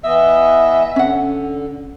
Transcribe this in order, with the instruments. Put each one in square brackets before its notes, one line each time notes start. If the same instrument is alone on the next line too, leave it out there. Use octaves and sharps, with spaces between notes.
[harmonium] E3 B3 D#5 [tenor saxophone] E5
[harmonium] D3 [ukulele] C#4 F#5